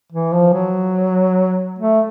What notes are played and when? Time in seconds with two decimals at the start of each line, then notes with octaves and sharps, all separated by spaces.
0.12 E3
0.32 F3
0.53 F#3
1.79 A3